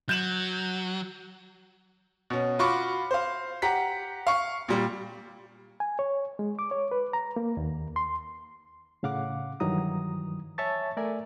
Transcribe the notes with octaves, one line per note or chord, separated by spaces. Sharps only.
F#3 G6 E7 F#7
B2 C#4
F4 F#4 B5 C#6 D6
C5 F5
G4 F#5 A#5 B6
F5 C#6
A#2 G3
G#5
C#5
G#3
D6
C#5
B4
A#5
A#3
D#2
C6
A2 C#3 F5 F#5 D6
G2 D#3 E3 F#3 A#5 D#6
C#5 E5 G#5 A5 C#6 A6
A3 A#4 D5 E5 G#5